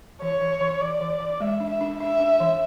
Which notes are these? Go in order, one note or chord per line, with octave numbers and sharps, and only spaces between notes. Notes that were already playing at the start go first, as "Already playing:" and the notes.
E3 C#5
E3
E3
E3 D5
E3
E3
G#3 E5
D4
E5
D4
D4 E5
D4
E3